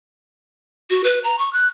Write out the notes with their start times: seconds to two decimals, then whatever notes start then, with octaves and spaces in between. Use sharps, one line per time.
0.90 F#4
1.04 B4
1.24 A#5
1.39 C#6
1.53 F#6